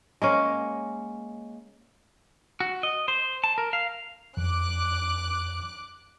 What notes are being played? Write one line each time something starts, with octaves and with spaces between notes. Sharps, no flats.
G#3 A#3 C#4
F#4
D#5
C5
A5
A#4
F5
F2 D6 F#6